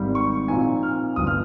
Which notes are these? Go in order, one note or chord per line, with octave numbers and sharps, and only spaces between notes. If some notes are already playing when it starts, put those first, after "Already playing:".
Already playing: G#1 G#2 G3
C#6
A#2 F3 C4 D#4 G#5
F6
G1 G2 F3 D#6
F6